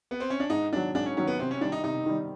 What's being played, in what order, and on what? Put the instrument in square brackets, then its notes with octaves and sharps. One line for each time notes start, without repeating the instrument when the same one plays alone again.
[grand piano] B3
C4
C#4
D4
[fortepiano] G#2 [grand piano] D#4
[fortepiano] D#3 F#3 [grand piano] D4
[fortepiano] G#2 [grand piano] D4
[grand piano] C#4
[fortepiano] D#3 F#3 [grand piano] C#4
[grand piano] B3
[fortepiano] C3 [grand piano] C4
[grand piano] C#4
[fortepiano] D#3 G3 [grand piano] D4
[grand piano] D#4
[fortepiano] C3 [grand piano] D#4
[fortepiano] D#3 G3